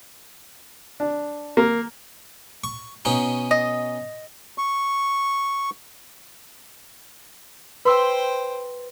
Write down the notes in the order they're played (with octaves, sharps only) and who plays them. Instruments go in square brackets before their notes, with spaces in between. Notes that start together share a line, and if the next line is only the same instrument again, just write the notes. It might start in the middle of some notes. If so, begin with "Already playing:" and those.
[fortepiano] D4
A#3
[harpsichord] C#6
B2 C#4 D#4
[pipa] D#5
[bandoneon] C#6
[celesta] B4 [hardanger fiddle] C5 G5 [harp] B5 C6 E6